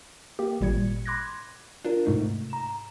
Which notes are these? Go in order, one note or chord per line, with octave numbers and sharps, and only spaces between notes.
A#3 G4
G#1 A#2 G3 G#6 C#7
B5 C6 D6 F#6 G#6 A#6
D4 F4 A#4
G#2 C3 A3 D#4
A#5 E7